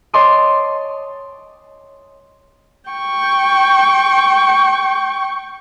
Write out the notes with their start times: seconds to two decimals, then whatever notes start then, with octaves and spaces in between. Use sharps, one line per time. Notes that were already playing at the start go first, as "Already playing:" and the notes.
0.14 C#5 D#5 A5 C6 D6 D#6
2.90 G5 C#6